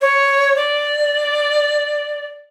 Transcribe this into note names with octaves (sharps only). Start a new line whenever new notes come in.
C#5
D5